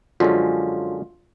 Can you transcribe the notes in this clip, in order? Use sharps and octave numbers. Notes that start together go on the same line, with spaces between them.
F#2 D3 F3 G#3 C#4 F4